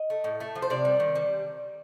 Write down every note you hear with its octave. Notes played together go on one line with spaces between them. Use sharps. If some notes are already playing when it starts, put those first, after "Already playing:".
Already playing: D#5
A3
A2
A3
F3
C5
C3 D5
G3
D#3
G3